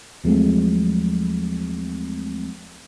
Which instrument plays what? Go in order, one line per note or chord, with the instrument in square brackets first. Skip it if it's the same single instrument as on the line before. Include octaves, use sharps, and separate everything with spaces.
[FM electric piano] D#2 F3 F#3 G#3 A3 C4